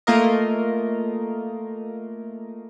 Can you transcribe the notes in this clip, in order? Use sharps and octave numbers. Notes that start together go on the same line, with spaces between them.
A3 A#3 F4 A#4 D#5